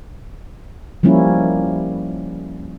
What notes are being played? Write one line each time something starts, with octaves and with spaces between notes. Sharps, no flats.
F3 G3 A#3 C#4 E4